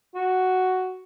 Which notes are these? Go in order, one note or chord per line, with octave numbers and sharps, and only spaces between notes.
F#4